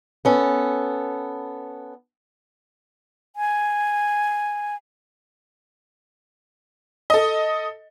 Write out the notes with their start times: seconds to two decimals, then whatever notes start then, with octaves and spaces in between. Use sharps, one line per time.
0.25 B3 C#4 A4
3.36 G#5
7.10 A4 D#5